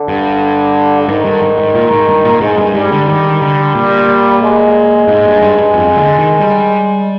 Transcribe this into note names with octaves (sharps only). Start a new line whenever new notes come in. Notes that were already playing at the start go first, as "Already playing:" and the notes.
Already playing: D3
G2
G#2 D#3
G2
G#2
G#2
A#2
G#2
G2
A#2
G#2 G#3
G2
G#2 G3
D3
D#3
D3
A#2
G#3
G#2
G2
G2
G2
F2
D3
D#3
G3